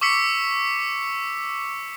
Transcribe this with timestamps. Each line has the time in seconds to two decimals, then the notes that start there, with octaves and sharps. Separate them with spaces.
0.01 C#6 D6 E6 B6 C#7